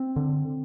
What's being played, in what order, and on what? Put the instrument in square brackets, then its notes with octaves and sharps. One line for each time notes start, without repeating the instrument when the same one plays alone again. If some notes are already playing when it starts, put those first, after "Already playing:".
Already playing: [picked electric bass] C4
D3